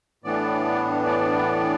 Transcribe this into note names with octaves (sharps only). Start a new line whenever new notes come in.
A2 E3 B3 D4 D5
D5